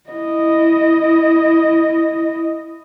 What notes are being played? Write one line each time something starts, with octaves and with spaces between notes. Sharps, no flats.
E4 D#5